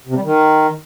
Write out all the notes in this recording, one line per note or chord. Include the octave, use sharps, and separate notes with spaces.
C3
G3
D#3